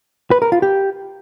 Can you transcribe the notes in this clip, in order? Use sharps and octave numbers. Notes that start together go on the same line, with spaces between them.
B4
A#4
F4
G4